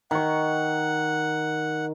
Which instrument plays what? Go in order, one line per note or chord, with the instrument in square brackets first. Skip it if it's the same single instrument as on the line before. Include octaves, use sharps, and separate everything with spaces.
[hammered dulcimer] D#3 C#6 [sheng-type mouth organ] F#5